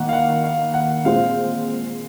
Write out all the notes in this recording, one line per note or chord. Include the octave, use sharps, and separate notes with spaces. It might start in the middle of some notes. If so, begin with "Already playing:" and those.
Already playing: D#3 A#3 F#5
F5
F#5
F5
F#5
A#2 G#3 C4 F4 C5 F5